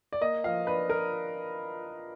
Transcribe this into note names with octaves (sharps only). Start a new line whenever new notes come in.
D5
A#3 D#5
F3 F5
D4 B4
A#4